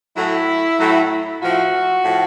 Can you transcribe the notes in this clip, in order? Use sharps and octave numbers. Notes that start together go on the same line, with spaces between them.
A2 F#3 A3 E4
A2 F#3 A3
A2 F3 A3 F#4
A2 F3 A3